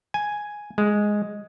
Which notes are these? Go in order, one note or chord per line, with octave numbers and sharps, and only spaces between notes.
G#5
G#3